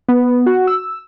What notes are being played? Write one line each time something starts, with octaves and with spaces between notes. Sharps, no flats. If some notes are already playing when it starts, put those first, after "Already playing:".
B3
F#4
E6